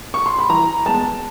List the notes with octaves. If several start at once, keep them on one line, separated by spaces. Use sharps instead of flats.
C#6
C6
B5
E3 A#5
G#3 B3 A5